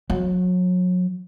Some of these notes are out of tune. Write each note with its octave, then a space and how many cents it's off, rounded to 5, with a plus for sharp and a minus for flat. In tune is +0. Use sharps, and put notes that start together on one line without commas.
F#3 -30